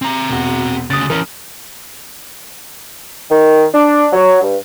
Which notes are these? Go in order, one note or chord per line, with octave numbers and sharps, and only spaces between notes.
C4 A#5
E1 F#4
D2 C#3 D#6 F#6 A6
E3 C#4 A#4
D#3
D4
F#3
G2